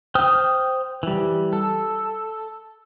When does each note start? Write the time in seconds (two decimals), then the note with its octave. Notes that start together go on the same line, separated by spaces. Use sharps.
0.15 C5 G5 D#6 F6 G6
1.03 E3 G3
1.53 A4